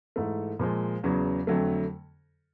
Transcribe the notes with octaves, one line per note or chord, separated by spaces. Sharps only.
G#2 E3 A3
A#2 F3 G#3
E2 C#3 F#3 B3
F2 D3 F#3 A3